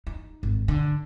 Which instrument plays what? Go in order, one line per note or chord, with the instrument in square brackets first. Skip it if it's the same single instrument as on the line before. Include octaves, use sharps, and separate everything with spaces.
[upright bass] D#4
G#1
D3